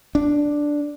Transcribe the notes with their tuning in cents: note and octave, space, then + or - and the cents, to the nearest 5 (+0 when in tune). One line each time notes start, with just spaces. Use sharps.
D4 +0